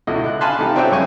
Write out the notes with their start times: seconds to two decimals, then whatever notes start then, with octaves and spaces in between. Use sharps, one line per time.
0.07 C#2 B2 D3 E4 F#4 D#5
0.26 F#6
0.41 F5 G#5 A5 B5 C6 F#6
0.58 C3 A3 D#4 G4
0.76 C4 D4 F#4 C#5 E5 G5
0.92 F#2 C#3 C4 G#5 C#6